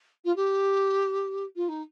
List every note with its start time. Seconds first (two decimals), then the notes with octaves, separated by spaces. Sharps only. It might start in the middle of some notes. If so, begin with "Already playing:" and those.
0.24 F4
0.36 G4
1.56 F4
1.68 D#4